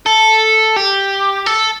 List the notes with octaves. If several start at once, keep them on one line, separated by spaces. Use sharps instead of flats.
A4
G4
A4